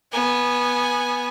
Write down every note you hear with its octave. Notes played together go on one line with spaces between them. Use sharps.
B3 G#5